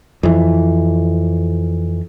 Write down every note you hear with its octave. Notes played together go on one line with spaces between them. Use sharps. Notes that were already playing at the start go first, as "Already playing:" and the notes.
F2 E3